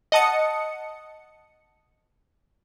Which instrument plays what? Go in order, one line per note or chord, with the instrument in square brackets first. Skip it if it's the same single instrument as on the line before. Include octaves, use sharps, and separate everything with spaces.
[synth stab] D#5 F#5 A5 D#6 C#7